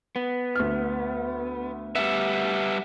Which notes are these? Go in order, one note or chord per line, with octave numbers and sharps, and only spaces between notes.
B3
D2 F6
G3 B3 E5